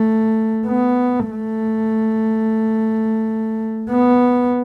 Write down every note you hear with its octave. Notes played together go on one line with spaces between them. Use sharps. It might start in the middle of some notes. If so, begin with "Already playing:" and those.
Already playing: A3
B3
A3
B3